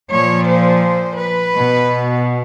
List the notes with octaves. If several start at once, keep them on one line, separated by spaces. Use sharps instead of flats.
A#2 F3 C#5
C5
B4
B2